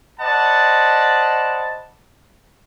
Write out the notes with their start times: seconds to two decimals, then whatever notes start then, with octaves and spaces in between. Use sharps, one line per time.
0.20 C5 D5 D#5 F#5 A5 B5